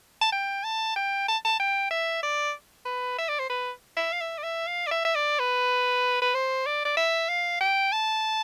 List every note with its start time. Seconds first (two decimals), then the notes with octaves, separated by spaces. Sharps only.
0.22 A5
0.32 G5
0.64 A5
0.96 G5
1.28 A5
1.45 A5
1.60 G5
1.91 E5
2.23 D5
2.85 B4
3.18 E5
3.29 D5
3.39 C5
3.50 B4
3.97 E5
4.13 F5
4.21 E5
4.38 D5
4.43 E5
4.67 F5
4.87 D5
4.91 E5
5.05 E5
5.15 D5
5.39 B4
6.22 B4
6.34 C5
6.66 D5
6.85 D5
6.97 E5
7.29 F5
7.61 G5
7.93 A5